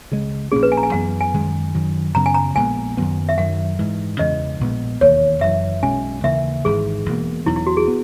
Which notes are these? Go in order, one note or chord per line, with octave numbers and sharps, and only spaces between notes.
C#2 C#3 G#3
A#1 A#2 A#3 C#4 G#4
B4
G#5
A#5
G#5
F#2 E3 B3 F#5
G#5
F#2 D#3 G#3
F#2 D#3 F#3
F#2 C#3 F#3 B3 A#5
G#5
A#5
A#1 A#2 G#3 B3 G#5
F#2 D#3 F#3 B3
E5
F#2 D#3 F#3 F#5
G#2 E3 G#3
E2 C#3 E3 G#3 D#5
A#1 A#2 G#3 B3
E1 D#2 D#3 A#3 C#5
F#1 F#2 E3 E5
B1 B2 G#3 C#4 G#5
D#2 C#3 E3 A#3 E5
G#1 G#2 E3 G#4
E1 E2 B2 A#3
E1 E2 B2 F#3 E4
E4
F#4
G#4
B3